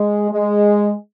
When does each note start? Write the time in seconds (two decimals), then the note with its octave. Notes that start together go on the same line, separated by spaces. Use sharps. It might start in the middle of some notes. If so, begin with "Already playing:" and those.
Already playing: G#3
0.30 G#3